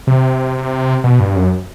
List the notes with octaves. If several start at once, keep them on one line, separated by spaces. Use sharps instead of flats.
C3
B2
G2
F#2